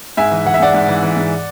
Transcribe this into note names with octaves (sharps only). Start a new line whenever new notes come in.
G#2 E5 G#5
E3
E3 F#5
E5
G#2 D5 F#5
G#2
E3
E3
G#2